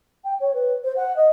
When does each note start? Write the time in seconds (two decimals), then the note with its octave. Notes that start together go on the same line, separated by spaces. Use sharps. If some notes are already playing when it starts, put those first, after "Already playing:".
0.24 G5
0.40 C#5
0.54 B4
0.84 C5
0.96 F#5
1.16 D#5